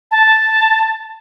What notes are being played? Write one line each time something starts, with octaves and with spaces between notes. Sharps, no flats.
A5